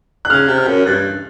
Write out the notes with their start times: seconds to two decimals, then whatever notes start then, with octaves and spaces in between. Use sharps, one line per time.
0.25 F#6
0.30 C#3 F6
0.48 C3
0.58 F6
0.67 F#2
0.85 G2 F#6